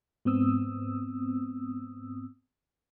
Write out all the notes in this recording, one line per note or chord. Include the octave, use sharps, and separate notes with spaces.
G#2 B3 C4 D#6 E6